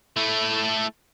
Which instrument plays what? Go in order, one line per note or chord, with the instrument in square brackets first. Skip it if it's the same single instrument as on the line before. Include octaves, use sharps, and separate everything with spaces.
[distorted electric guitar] A3 E4